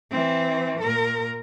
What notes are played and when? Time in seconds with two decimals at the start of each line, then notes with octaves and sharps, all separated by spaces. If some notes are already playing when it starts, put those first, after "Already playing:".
0.11 E3 C4
0.80 A#2 A#4